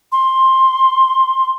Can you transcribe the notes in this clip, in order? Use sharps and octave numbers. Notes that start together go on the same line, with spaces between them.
C6